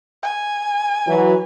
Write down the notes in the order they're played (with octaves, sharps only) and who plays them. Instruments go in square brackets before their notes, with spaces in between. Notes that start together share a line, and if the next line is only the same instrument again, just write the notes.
[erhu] G#5
[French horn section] E3 F#3